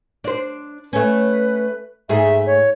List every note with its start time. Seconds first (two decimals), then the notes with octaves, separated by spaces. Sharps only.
0.24 D4 C5
0.93 A3 C#4 B4
2.09 G#2 A3 G#4 E5
2.46 C#5